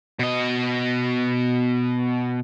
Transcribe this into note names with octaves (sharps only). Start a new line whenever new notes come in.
B2 D#5